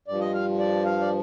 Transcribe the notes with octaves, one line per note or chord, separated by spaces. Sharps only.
G2 F3 D5
D#5
F5
D5
F5
D5